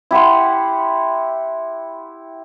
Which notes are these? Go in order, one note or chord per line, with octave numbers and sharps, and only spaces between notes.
E4 G4 F#5 C6